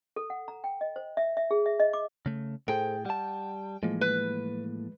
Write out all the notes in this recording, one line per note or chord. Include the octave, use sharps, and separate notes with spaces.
A4
F#5
A#5
G5
D#5
C5
E5
E5
G#4
E5
D#5
D6
C#3 A3
A2 G#4 A4 C5 G5
G3 F#5 A5
A2 E3 F3 G#3 A#3
B4